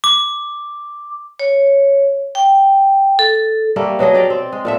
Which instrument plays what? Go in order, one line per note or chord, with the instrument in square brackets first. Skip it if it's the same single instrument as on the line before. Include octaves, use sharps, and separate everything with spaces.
[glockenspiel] D6
[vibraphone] C#5
G5
A4
[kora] G3 A3 A#3
B2 F#3 G#4 D#5
G4 D5 F5 G5
C4
G#3
A#2 A3 E5